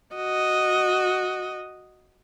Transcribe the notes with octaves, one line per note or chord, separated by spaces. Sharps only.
F#4 D#5